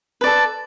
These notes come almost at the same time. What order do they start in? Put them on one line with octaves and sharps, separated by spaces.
B4 D5 A4